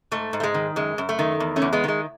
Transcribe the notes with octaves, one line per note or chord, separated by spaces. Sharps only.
G#2 A3
G#2
A3
G#3
D#3
F#2 G#3
F#2
A3
D#3
E2
A3 C#4
E2
G#3 B3
D#3 G#3